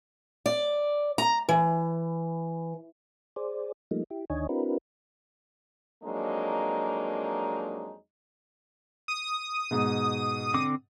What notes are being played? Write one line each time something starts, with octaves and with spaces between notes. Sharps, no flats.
D5
A#5
E3
G#4 C5 D5
F3 G3 A3 A#3 D#4
E4 G4
D2 D#3 D4 C#5 D#5 G#5
C4 D4 E4 F#4 A#4 B4
F2 F#3 G#3 A#3 D4 D#4
D#6
G#2 B2
D3 C4 D6